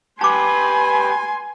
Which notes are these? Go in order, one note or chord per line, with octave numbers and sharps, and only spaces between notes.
G4 B4 G#5 A5 C6 D6